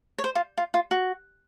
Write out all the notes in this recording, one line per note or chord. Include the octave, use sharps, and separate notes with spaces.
C#5
C5
F4
F4
F4
F#4